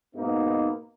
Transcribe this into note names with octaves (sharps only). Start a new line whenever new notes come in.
G#2 B2 A#3 B3 D#4